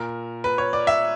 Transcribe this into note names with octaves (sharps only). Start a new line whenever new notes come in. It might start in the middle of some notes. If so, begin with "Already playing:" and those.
Already playing: A#2 A#4
B4
C#5
D5
E5